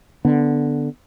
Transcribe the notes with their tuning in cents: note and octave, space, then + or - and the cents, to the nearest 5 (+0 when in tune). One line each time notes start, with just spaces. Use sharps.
D3 +0 B3 +0